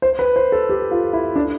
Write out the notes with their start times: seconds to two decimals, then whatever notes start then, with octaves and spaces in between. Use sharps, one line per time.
0.02 C5
0.19 B4
0.36 C5
0.52 A4
0.69 G4
0.91 F4
1.13 E4
1.36 D4